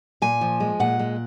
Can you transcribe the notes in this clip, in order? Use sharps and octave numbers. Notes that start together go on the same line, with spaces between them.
A#2 G#5
F3
G#3
A#2 F#5
G#3